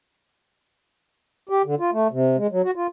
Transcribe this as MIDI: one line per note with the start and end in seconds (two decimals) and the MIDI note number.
1.49 1.62 67
1.65 1.75 50
1.80 1.90 65
1.92 2.07 57
2.11 2.37 48
2.37 2.47 56
2.51 2.62 54
2.64 2.71 66
2.76 2.87 65